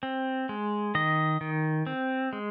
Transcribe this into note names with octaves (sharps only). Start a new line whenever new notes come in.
C4
G#3
D#3 D#5
D#3
C4
G#3